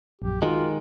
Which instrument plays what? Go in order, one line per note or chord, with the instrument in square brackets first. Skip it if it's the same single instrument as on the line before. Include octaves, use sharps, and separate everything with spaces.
[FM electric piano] A#1 F#2 [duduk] G4
[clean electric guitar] D#3 G#3 [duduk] F4 [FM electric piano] F#4